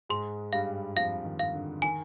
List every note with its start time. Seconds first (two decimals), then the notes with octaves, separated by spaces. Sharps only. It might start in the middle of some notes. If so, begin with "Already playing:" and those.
0.09 G#2 G#3 C6
0.53 G2 G3 F5
0.96 F2 F3 F5
1.25 D#3
1.39 F5
1.54 D3
1.82 D#3 G#5